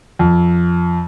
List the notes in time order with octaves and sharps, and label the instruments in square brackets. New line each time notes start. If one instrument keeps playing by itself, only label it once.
[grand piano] F2